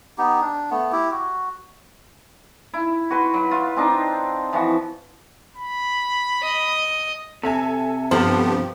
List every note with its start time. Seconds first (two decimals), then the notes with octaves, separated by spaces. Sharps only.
0.18 B3 D#4 G4
0.41 D4
0.70 A3 B3
0.92 E4 G4
1.11 F#4
2.74 E4
3.10 F#4 B4 C6
3.34 F#3
3.51 F4
3.76 C4 D4 D#4
4.53 E3 F3 F#4
5.56 B5
6.42 D#5
7.43 C3 A4 E5 G#5
8.11 G2 F3 B3 G4 A4 C5